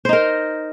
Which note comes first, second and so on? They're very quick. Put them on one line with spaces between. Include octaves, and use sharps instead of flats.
C5 D#4 A#4